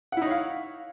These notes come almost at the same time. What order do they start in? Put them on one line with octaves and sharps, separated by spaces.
F#5 E4 D#4 C#5 F5